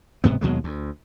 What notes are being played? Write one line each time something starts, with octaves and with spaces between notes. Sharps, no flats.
F#1 G#2 C3 B3
D#2 B2 F#3 G#3
D2